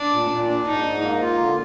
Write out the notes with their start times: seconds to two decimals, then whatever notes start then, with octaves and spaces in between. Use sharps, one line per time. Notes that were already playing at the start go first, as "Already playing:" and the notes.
Already playing: D4
0.11 A#2
0.30 A#2
0.48 D4
0.66 G#2 D#4
0.85 G#2
1.03 A#3
1.22 F4
1.40 D3